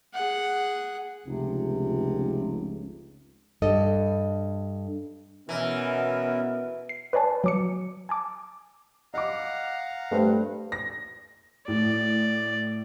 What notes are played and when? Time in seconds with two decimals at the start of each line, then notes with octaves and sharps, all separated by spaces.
0.14 G#4 F#5
1.26 F1 C#2 C3
3.62 G2 A4 D#5
5.49 B2 E3 B3 C#4 E4 A#4
6.89 C7
7.13 B4 C#5 D5 G#5 A5
7.44 F#3 D6 C#7
8.09 G#5 A5 D6
9.14 D#5 F5 F#5 A#5 D6
10.11 G2 A3 C5
10.72 A#6
11.68 A2 D5